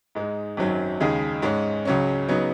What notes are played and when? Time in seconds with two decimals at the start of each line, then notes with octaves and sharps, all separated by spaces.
0.15 G#2 G#3 D#4
0.57 G#1 F#2 D#3 F#3
1.01 D#2 C#3 G#3 D#4 G#4
1.42 G#2 G#3 C#4
1.85 C#2 C#3 F#3 C#4
2.29 C#3 F#3 B3 D#4